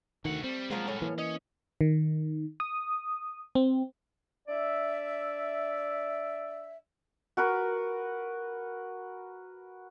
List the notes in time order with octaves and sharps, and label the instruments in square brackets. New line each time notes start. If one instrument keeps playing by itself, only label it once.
[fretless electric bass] D2 D#3 [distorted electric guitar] C3 F#5 [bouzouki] A3
[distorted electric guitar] G3 [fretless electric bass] C4
[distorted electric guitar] C2 F#3 [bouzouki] F3 A#3 C4 [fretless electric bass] G#3
[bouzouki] A2 C#4
[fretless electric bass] E3 A#3
[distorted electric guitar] C#4 [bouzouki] D#5
[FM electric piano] D#3
D#6
C4
[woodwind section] D4 D5 E5
[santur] F#4 A#4 B4